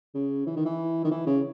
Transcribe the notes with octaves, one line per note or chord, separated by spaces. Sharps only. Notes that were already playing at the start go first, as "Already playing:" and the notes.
C#3
E3
D#3
E3
D#3
E3
C#3